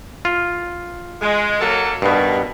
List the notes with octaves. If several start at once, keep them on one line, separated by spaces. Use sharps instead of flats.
F4
G#3
F#3 A#3 A4
G2 B2 D#3 B3